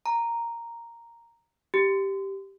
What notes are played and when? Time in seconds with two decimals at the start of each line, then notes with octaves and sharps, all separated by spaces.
0.06 A#5
1.74 G4